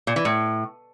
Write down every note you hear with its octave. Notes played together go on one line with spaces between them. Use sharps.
A#2
E3
A2